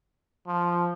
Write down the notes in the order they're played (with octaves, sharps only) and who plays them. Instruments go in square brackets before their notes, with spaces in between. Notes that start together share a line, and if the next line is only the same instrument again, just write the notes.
[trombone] F3